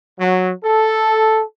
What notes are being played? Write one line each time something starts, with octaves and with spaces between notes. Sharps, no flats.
F#3
A4